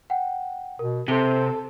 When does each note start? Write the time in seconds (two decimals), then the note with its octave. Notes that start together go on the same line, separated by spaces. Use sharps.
0.10 F#5 G5
0.79 B2 A#4
1.08 C3 A4 C5 G7